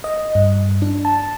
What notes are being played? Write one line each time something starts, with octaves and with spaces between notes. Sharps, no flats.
D#5
G2
D4
A5